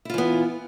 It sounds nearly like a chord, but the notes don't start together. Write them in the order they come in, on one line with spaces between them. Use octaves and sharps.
E4 F4 E3 B3